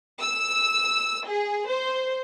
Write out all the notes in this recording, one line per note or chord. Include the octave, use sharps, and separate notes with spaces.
E6
G#4
C5